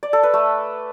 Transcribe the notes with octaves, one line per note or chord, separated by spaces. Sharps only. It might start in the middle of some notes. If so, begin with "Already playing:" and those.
D5
A4
B4
A3